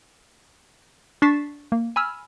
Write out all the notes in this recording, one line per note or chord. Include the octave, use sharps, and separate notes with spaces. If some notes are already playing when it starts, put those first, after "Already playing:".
D4 C#6 A6 B6 C7 E7
A#3
G#5 B5 E6 F6